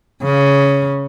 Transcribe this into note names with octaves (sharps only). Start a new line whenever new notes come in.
C#3